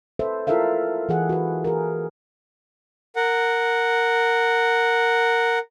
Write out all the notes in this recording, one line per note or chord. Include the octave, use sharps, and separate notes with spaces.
A4 B4 C5 E5
E4 F4 A4 A#4 E5 F5
E3 G#4 F#5
F#4 B4
G#4 A#4
A#4 F#5